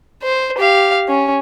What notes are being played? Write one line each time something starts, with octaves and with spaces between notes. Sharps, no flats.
C5
G4 F5
C#4